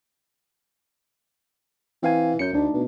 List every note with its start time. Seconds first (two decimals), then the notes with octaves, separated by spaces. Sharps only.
2.03 E3 C4 F5 G#5
2.39 F#2 G6 C#7
2.53 D2 A3 D4 D#4
2.74 B2